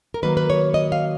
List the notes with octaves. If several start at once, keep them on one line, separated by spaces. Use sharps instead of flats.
A#4
D#3 F#3 A#3 B4
B4
C#5
D#5
F5